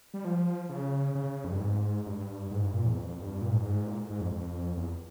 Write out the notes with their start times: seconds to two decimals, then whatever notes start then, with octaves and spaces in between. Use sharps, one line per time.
0.14 G3
0.25 F3
0.69 C#3
1.15 C#3
1.44 F2
1.52 G2
1.60 G#2
2.06 G2
2.51 G#2
2.63 G2
2.73 A#2
2.86 E2
2.96 F2
3.20 G2
3.42 A#2
3.50 G#2
3.57 G2
3.65 G#2
3.87 A#2
3.98 G#2
4.10 G#2
4.21 F2
4.32 F2
4.77 E2